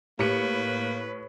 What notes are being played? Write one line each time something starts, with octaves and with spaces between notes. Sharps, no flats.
A2 A#3 G4 B4 C#7